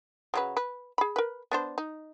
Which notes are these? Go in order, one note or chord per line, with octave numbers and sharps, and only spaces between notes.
C#3 F#3 B4
B4
G#4 B5
A#4 B4
B3 D4 C5
D#4